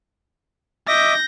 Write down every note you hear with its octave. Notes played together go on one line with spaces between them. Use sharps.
D#5 E5 D6 G6 A#6